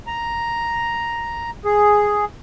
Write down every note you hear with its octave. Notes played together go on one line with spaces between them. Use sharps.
A#5
G#4